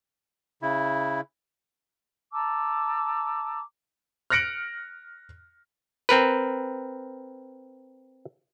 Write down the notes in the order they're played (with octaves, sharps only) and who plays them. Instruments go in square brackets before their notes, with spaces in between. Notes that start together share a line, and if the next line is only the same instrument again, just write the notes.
[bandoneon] C#3 E4
[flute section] A5 A#5 D6 E6
[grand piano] F6 F#6 A#6 C#7 D7 F#7
[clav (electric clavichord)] C4 A#4 B4